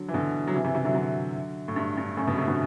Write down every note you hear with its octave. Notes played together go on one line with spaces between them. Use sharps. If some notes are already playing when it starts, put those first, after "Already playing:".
Already playing: D3 F#3
E3
B2 D3
F#3
C3 E3
C3 E3
C3 E3
D3 F#3
D3 F#3
A2
G2
G2
F#2 A2
G2 B2
A2 C3
B2 D3